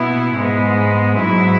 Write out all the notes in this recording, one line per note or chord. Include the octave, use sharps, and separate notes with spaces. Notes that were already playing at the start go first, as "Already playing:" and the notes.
Already playing: B2 B3 E4
G#2 G#3 B3
G#2 F#3 E4